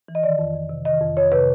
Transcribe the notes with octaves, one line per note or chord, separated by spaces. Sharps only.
E3
D#5
D#3 D5
F2
F2
C3
D#3 D#5
F2
F2 C#5
C3 B4